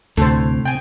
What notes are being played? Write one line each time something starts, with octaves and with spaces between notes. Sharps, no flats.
D2 A2 C3 C4 A4 C5
G5 G#5